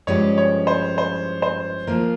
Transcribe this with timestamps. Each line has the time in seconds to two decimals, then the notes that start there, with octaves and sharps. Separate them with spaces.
0.07 G2 F3 G#3 C#4 G4 C#5
0.38 C#5
0.67 C5
0.98 C5
1.42 C5
1.87 F3 A#3 F4 A#4